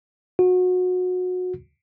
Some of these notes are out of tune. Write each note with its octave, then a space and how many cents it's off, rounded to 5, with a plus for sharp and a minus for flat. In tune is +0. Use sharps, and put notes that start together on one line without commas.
F#4 -25